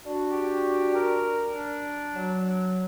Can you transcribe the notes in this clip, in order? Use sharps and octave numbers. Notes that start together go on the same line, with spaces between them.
D4 F#4
G4
A#4
D4
F#3